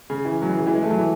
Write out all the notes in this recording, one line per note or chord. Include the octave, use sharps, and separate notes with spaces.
C#3
E3
F#3
E3
C#3
E3
G#3
A3
F#3
E3